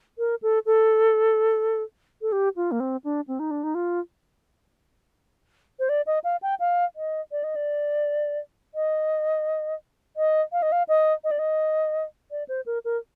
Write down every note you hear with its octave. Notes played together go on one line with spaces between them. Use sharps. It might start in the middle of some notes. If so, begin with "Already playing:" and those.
A#4
A4
A4
A4
G4
F4
A#3
C4
D4
C4
D#4
D4
D#4
F4
C5
D5
D#5
F5
G5
F5
D#5
D5
D#5
D5
D#5
D#5
F5
D#5
F5
D#5
D#5
D5
D#5
D5
C5
A#4
A#4